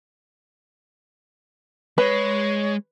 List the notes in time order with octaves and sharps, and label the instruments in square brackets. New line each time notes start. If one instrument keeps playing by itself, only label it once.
[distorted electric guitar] G#3 [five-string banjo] B4 [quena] C#5